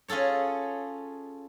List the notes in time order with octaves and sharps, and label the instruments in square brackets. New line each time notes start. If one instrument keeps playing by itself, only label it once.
[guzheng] C#4 F4 G#4 A4 C#5